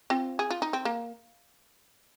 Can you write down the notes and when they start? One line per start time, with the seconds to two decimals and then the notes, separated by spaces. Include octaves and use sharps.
0.10 C4 F4
0.39 G#4
0.50 F4
0.62 D#4
0.73 C4
0.85 A#3